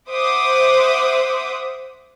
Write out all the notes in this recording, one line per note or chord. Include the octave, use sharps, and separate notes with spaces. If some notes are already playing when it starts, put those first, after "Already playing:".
C5 E5 F#5 D6 D#6